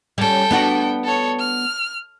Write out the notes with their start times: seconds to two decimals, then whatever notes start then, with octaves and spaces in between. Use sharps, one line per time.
0.18 G3 C#4 A4 G5
0.51 B3 D4 F#4
1.04 A4 C#5
1.39 F6